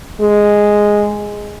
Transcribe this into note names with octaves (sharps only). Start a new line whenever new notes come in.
G#3